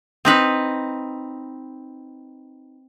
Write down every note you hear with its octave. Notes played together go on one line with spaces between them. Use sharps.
C4 D#4 B4